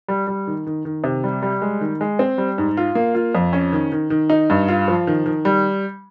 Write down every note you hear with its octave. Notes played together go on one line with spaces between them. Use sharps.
G3
G3
D#3
D#3
D#3
C3
G3
G3
G#3
D#3
G#3
C4
G3
G#2
F4
A#3
F4
F2
C#4
D#3
D#3
D#3
D#4
G2
F4
F3
D#3
D#3
G3